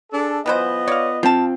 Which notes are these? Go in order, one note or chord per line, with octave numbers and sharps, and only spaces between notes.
D4 G#4 A4
E3 F#3 B3 F4 C5 D#5
C#5 D5 F5
F3 C4 F4 A5